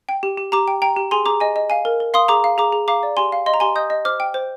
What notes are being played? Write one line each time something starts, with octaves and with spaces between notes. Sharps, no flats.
G5
G4
G4
G4 A#5 D6
G5
G5 A#5
G4
G#4 G#5 C6
G#4 A#5 D6
D#5 G#5
D#5
F5 G#5
A#4
A#4
F5 C6 D#6
G#4 A#5 D6
F5
G#4 A#5 D6
G#4
F5 A#5 D6
D5
G4 G#5 C6
F5
D#5 C6
A#5
G4 G#5 C6
D#5 D#6 G6
D#5
C5 D6 F6
G5
C5